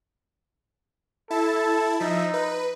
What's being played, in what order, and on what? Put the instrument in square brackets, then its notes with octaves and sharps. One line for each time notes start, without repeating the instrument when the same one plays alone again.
[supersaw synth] E4 A5 [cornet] A4
[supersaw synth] F3 E5 [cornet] D#4
[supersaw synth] B4